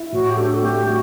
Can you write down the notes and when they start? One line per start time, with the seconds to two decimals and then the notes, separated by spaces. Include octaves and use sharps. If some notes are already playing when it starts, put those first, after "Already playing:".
Already playing: E4
0.12 A2 F#4
0.30 G4
0.37 D4 A4
0.54 F#4
0.62 A3 G4
0.87 A3 F#4